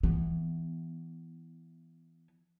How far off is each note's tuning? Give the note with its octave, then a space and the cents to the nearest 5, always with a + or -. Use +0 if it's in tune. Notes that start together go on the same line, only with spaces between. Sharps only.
E3 +0 B3 +0